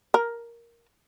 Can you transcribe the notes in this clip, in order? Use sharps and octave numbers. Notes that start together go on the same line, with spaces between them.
A#4